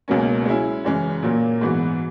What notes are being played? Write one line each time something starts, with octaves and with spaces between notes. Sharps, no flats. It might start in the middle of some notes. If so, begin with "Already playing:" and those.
C#2 B2 F#3 A#3 C#4
G#3 C#4 E4
F#2 C#3 E3 G#3 C#4
A#2 F#3 A#3
G#2 E3 B3 F#4